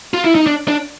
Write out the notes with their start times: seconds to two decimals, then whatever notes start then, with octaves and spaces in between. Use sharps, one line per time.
0.14 F4
0.24 E4
0.35 D#4
0.46 D4
0.68 D4